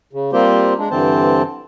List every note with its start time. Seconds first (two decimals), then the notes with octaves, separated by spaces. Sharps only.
0.13 C#3
0.33 G3 A#3 C4 F4 G4 C5
0.78 G#3 D4
0.91 G2 D3 E3 C4 C5 A5